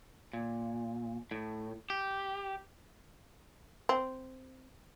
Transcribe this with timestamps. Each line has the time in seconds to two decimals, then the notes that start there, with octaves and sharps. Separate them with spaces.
0.33 A#2
1.31 A2
1.90 G4
3.89 C4